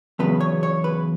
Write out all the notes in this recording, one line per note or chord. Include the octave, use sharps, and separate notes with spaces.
E2 C#3 F#3 B3 B4
C#5
C#5
B4